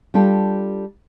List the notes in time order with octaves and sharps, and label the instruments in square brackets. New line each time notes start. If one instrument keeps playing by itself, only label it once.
[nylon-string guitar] G3 D4 F4 G4 A4